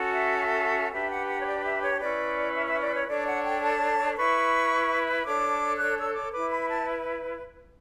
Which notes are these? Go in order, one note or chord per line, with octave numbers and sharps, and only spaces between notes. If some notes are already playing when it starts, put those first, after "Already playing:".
Already playing: C#4 F#4 A4
E5
E5
D4 G4 B4 E5
F#5
F#5
C#5
D5
E5
C#5
C#4 E4 B4 D5
E5
E5
D5
C#5
D4 A4 C#5 D5
F#5
G5
A5
E4 B4 C#6
D4 A4 C#5 D6
F#6
E6
D6
E4 B4 D6
B5
A5